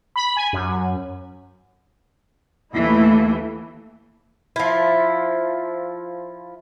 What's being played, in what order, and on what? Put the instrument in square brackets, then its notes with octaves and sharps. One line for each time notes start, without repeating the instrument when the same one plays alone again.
[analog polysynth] B5
G#5
F#2
[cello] D#2 E3 [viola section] A3 E4
[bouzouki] F3 E4